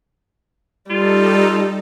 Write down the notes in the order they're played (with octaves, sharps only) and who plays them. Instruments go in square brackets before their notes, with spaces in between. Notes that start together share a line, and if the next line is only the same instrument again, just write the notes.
[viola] G3 [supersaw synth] D#4 A4 [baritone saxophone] F4